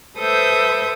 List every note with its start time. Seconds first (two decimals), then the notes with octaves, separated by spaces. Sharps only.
0.19 A4 B4 C5 E5 D#6 G6